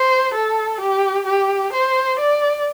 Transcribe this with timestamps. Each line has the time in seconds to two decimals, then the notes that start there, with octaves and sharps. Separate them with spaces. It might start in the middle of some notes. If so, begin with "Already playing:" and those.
Already playing: C5
0.34 A4
0.80 G4
1.26 G4
1.73 C5
2.19 D5